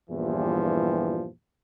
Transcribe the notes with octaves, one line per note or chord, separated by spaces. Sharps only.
E2 G2 A#2 E3 F3 G3